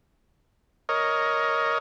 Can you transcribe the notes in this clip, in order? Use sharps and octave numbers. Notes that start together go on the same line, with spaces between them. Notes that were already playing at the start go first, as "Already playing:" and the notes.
A#4 C#5 D#5